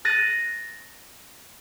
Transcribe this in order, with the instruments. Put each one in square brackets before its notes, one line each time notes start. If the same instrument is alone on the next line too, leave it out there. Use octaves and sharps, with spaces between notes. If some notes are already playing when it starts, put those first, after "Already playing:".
[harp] F#6 A6 A#6 D#7